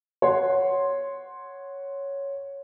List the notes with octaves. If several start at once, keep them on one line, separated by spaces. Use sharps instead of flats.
C#5 F#5 C6